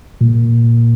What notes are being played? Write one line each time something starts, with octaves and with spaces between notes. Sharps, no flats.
A#2